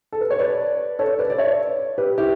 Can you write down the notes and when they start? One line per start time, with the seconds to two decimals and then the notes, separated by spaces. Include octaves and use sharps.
0.12 A4
0.21 B4
0.31 C#5
0.39 B4 D5
0.99 A4 C#5
1.19 B4 D5
1.30 D5
1.38 C#5 E5
1.98 G4 B4
2.18 E4 G4